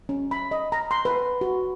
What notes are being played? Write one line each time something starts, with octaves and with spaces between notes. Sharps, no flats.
C#4
B5
D#5
A#5
C6
B4
F#4